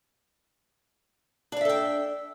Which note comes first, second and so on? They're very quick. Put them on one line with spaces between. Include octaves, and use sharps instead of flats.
D4 D5 E5 A4 G5